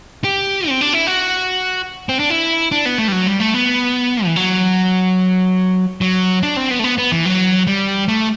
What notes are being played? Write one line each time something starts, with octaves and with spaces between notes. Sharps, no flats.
G4
C4
D4
E4
F#4
C4
D4
E4
D4
B3
A3
G3
F#3
G3
A3
B3
E3
F#3
F#3
D4
C4
B3
A3
B3
B3
E3
F#3
G3
A3